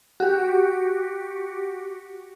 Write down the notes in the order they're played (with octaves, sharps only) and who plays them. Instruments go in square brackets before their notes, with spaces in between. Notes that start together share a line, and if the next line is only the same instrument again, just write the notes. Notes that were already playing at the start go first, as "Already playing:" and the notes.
[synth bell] F#4 G4